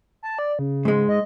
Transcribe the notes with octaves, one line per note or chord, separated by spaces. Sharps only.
A5
D5
C#3
G#2 G#3
D#5